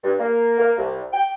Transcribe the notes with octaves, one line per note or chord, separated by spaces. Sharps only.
G2
A#3
A#3
C2
G5